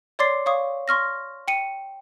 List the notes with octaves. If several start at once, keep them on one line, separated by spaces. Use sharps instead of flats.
C#5 D5 C6 D6 A6 C7
C#5 F5 C#6 D#6
C6 C#6 F6 A#6
G5 C#7 D#7